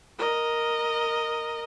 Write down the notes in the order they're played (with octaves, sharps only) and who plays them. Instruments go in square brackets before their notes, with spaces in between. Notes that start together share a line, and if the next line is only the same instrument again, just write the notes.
[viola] A#4 D#5